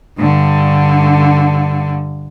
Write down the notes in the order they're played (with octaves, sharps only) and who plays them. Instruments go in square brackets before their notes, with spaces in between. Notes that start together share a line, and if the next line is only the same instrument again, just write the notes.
[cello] G2 D3